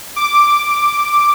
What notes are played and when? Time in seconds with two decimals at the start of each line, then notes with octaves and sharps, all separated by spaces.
0.16 D6